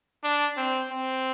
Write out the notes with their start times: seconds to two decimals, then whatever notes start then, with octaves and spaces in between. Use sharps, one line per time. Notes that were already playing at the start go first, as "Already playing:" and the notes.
0.23 D4
0.57 C4
0.92 C4